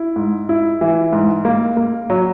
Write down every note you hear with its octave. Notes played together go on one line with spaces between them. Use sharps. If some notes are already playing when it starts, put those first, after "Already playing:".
Already playing: E4
G#2
E4
E3
G#2
A#3
A#3
F#3